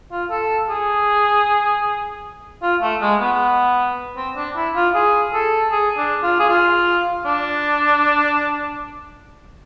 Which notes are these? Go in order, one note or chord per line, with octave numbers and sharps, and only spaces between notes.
F4
A4
G#4
F4
A3
G#3
B3
C4
D4
E4
F4
G#4
A4
G#4
D4
F4
G#4
F4
D4